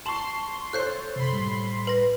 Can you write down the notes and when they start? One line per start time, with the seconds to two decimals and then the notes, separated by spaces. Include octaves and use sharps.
0.06 A5 C6 C#6 E7 F#7
0.73 A4 C5 C#5 F#6 G6 C7
1.16 F#2 C3 B5 C6
1.33 A2 G3
1.87 B4 A#6